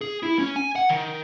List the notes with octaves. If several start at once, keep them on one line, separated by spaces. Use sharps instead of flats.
G#4
E4
C#4
G#5
F#5
D#3